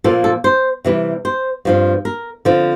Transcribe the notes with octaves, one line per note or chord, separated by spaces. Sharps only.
A#2 F3 A#3 A4
A4
C5
C3 E3 G3
C5
G2 F3 C4
A#4
D3 F3 C4